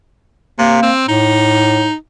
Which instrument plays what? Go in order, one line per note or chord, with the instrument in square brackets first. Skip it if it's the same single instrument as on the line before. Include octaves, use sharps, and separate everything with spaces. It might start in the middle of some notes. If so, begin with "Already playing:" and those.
[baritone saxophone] C3 [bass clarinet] A#3
[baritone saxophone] C4
[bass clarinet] A2 [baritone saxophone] D#4